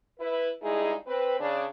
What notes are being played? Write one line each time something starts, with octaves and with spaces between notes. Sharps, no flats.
E4 B4
G2 G#3 D#4 E4 G#4
C4 B4
C#3 D4